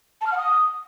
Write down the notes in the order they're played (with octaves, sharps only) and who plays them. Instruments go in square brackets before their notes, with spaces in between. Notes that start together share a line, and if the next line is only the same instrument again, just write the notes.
[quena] A5
F6
F#5
D#6